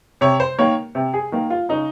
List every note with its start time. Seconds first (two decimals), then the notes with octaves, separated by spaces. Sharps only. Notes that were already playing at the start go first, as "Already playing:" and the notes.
0.21 C3 C#5
0.40 C5
0.58 D#3 A#3 C#5
0.95 C3
1.14 G#4
1.32 D#3 A#3
1.50 F4
1.69 C#3 D#4